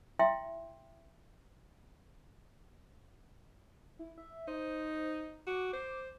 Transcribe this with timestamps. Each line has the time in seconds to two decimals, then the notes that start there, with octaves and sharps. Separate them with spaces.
0.19 E4 E5 G5 C6
3.99 E4
4.18 E5
4.48 D#4 C5
5.47 F#4 D6
5.74 C5